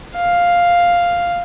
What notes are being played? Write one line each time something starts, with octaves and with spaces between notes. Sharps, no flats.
F5